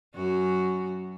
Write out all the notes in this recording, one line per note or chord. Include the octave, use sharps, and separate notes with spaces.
F#2 F#4